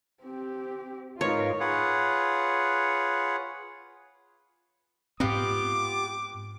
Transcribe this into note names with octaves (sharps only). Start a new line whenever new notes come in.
C4 G4
G#2 D#4 F4 A#4 B4 C#5
F4 G#4 B4 C#5 F#5
G#2 B3 C4 F4 G4 D6